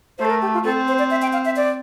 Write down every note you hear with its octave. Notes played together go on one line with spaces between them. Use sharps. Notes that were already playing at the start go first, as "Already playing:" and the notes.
A3 C5
A4
A#4
G4
F4
C4 A4
C5
D5
E5
G5
F5
E5
D5